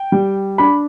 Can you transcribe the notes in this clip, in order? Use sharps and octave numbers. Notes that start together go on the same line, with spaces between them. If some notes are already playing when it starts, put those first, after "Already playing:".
Already playing: G5
G3
D4 B5